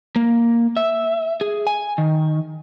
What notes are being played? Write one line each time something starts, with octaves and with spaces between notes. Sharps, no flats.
A#3
E5
G#4
G#5
D#3